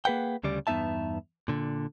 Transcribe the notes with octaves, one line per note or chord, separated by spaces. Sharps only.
A#3 G#4 B4 F#5 G5
D2 C#3 G3 D5
E2 G2 B3 D#4 E5 A5
A#2 D3